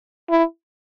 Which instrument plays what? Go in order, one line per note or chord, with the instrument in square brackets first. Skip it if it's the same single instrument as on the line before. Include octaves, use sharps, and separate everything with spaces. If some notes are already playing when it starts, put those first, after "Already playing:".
[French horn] E4